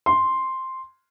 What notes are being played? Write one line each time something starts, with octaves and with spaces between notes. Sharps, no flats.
C6